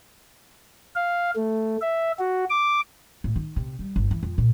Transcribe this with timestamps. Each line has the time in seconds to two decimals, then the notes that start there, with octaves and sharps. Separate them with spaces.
0.96 F5
1.36 A3
1.81 E5
2.19 F#4
2.50 D6
3.24 A2
3.36 D#3
3.56 C3
3.79 G3
3.96 G1
4.11 E3
4.23 F2
4.38 A#2